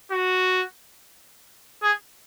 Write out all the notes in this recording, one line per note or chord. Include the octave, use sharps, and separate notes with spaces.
F#4
G#4